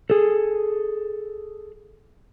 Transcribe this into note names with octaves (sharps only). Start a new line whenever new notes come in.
G#4 A4